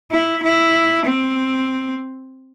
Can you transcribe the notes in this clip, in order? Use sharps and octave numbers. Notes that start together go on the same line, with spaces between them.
E4
E4
C4